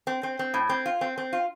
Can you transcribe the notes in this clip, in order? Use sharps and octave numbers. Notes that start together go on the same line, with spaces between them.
C4
C4
C4
A2
C4
F4
C4
C4
F4